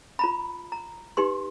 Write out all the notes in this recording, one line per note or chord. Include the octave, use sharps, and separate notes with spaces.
F4 A#5 B5
A#5
D#4 G4 B4 C6